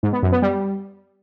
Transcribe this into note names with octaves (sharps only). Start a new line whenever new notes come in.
G#2
B3
F#2
B3
G3